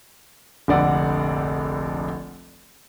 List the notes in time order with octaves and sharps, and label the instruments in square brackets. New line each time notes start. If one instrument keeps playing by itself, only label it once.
[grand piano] F1 A#1 D3 D5 F#5